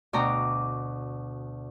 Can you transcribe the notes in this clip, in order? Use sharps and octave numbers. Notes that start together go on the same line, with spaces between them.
D2 B2 D5 G5 A#5 D6